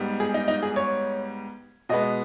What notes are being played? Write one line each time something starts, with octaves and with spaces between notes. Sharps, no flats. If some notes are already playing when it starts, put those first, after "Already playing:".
Already playing: G#2 G3 B3
G#4
D#4
D#4
G#4
C#5
B2 G#3 B3 D#5